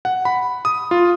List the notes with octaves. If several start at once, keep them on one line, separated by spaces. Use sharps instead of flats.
F#5
B5
D#6
F4